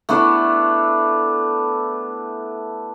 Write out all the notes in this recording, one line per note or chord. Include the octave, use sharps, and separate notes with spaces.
A3 B3 D4 E4